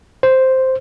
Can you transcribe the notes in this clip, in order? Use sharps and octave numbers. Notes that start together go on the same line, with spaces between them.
C5